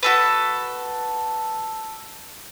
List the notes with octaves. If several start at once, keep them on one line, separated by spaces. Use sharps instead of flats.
F#4 A4 B4